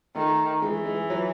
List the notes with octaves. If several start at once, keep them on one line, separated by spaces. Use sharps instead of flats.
D#3 A3
E3 G#3
G#3
F#3